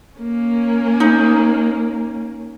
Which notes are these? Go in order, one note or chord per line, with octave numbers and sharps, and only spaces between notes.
A#3 C#4
D#4